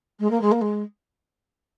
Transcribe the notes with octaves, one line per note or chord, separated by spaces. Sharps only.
G#3
A#3
G#3
A#3
G#3